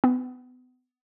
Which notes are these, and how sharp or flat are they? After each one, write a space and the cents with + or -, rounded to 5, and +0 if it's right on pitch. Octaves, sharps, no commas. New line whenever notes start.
B3 +35